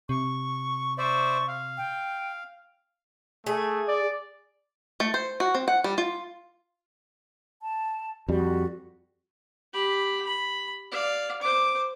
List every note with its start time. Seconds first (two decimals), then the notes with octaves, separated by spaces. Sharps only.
0.09 C3 C#6
0.98 C5 D5 E5 C#6
1.48 F5
1.78 G5
3.46 A3 G#4
3.88 D5
5.00 A3
5.14 C5
5.40 F#4
5.55 C4
5.68 F#5
5.84 G3
5.98 F4
7.62 A5
8.28 F2 G3 F#4
9.73 G4 B5
10.27 B5
10.91 D5 F5
11.42 C5 D6